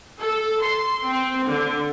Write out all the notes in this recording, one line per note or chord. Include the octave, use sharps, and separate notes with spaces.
A4
C6
C4
D3